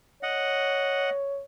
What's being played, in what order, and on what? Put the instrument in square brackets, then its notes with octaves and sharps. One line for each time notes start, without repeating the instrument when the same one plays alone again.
[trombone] C#5 [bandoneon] D#5 F#5